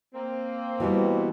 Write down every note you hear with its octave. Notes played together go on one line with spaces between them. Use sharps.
A#3 C4
B2 E3 G3